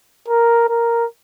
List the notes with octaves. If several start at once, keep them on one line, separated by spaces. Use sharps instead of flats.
A#4
A#4